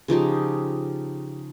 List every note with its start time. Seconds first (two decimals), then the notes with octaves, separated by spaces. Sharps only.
0.08 C#3 F3 D#4 G4